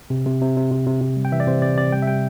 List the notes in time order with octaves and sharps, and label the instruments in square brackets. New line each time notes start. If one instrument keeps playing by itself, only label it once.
[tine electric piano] C3
C3
C3
C3
C3
C3
C3
G3
G5
E3 E5
D5
C3 C5
C3 D5
C3 D5
G3 G5
E5
G3 G5